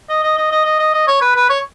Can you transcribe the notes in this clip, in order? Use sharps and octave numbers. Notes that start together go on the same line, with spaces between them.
D#5
D#5
D#5
D#5
D#5
D#5
D#5
C#5
B4
B4
C#5